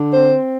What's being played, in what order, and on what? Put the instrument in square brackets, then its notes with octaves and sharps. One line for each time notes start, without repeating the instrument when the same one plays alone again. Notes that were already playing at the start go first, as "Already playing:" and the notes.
Already playing: [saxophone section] D3
C4 C5